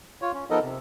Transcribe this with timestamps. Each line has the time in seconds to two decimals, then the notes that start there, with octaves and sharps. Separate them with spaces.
0.22 F4 C#5
0.34 C#4
0.50 F3 B3 D#4 A4 A#4 D#5
0.63 C3